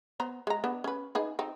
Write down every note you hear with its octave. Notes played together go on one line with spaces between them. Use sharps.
B3 C5 A#5
G#3 A#5
B3 D4
C#4 B4
D#4 G#4 B4
C4 D#4